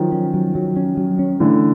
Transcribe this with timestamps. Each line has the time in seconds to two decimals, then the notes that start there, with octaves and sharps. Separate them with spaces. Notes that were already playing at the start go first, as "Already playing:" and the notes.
Already playing: D#3 F3 F#3
0.12 C#4
0.34 F#3
0.55 F#3
0.76 C#4
0.97 F#3
1.19 C#4
1.40 D3 E3 A3